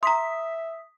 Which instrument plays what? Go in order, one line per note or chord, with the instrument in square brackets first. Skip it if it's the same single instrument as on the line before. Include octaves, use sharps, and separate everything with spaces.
[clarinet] E5 [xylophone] A#5 C6 [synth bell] D#6 B6